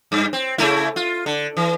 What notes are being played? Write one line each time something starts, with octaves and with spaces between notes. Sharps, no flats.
G2
C4
C#3 A3 E4
F4
D3
E3